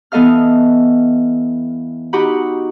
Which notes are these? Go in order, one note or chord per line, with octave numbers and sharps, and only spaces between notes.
E3 B3 A4 D#5 F5 F6
D#4 F#4 G4 F#5 B5